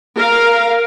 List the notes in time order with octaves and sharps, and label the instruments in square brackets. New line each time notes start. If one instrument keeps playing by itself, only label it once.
[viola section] A#4 F5